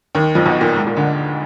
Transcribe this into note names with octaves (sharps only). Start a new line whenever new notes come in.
D#2 D#3
F2 F3
B1 B2
A#2
G#2
A#2
D2 D3